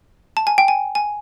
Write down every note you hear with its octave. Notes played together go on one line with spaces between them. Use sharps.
A5
G#5
G5
G#5
G#5